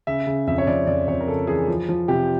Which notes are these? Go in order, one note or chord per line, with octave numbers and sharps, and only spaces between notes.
C#3 E5
C#3
F2 E5
C#5
F2 D5
F2 D5
F2 C#5
A#4
C#3 A4
E3 G#4
F3
F3
C3 G4